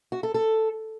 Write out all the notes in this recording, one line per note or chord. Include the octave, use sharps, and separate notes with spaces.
F#4
A4
A4